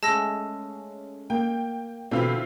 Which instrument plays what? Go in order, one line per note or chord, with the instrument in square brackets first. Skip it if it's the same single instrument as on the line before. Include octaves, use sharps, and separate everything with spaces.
[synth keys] G#3 A3 C#4 [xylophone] A5 E6 A#6
[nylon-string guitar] A#3 [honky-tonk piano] G5
[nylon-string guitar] B2 E3 [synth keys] D3 [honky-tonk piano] C4 E4 F4